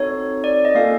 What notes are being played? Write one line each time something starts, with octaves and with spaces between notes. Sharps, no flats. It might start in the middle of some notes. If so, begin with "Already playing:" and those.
Already playing: C4 D#4 F#4 A4 C#5
D5
D#5
A#3 C#4 F4 A4 F5